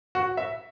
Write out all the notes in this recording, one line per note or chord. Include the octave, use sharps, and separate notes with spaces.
F#4
E5